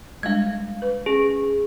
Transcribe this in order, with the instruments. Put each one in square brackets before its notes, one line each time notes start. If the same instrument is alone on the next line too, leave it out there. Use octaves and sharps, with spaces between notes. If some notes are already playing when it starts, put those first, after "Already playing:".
[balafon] G3 G#3 D4 [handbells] F5 G#6
[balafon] B4
[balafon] C#4 [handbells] G#4